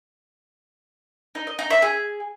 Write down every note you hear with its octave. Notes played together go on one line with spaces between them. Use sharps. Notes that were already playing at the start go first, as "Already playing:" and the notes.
D#4
D#5
D#4
E5
G#4